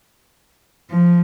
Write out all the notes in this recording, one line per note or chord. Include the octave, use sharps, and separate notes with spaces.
F3